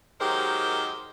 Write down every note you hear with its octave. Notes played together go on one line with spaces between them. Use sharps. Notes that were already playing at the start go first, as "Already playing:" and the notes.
D#3 F#3 G#3 G4 A#4 C5